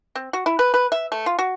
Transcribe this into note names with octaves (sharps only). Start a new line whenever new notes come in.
C4
F#4
E4
B4
B4
E5
A3
F4
F#4